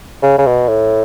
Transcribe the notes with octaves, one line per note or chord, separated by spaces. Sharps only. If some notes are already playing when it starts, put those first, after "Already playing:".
C#3
C#3
B2
A2